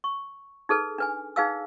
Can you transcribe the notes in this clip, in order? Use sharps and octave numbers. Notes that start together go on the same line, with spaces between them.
C#6
D#4 G#4 A4 B4
D4 B4 G#5
D#4 G#4 B4 F5 G#5 E6